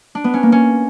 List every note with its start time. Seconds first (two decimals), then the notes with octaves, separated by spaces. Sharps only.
0.15 D4
0.24 B3
0.34 C#4
0.43 A#3
0.52 C#4